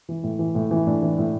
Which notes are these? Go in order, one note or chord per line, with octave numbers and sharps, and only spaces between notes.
E3
A2
E3
A2
E3 E4
A2 D4
E3
A2